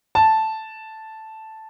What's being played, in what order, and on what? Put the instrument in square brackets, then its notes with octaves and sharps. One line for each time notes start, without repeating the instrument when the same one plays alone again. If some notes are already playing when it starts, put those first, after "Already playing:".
[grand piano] A5